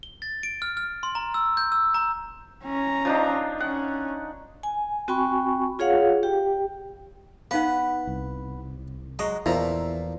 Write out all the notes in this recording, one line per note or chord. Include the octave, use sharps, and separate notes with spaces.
G7
A6
D7
F6
F6
C6
A#5
E6
G6
E6
A#5
C#4 A#5
F3 D4 D#4
C#4 F#5
G#5
C4 F#4 G5 G#5 B5 C#6
F4 G#4 C#5 F5 F#5
G4 G5
B3 D#4 B4 F5 F#5
C2
F#3 G#3 D#5 A#5
E2 A#2 F3 E4 E5 A#5